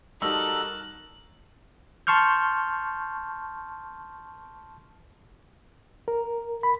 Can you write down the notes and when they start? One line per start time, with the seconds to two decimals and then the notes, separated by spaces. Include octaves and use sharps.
0.22 G3 D#4 F#4 A4 A#4 A5 E6 F#6
2.07 A5 C6 C#6 F6 G6
6.08 A#4
6.63 B5